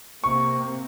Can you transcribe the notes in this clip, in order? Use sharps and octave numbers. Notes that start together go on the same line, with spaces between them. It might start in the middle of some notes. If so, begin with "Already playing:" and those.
C3 A#3 C#6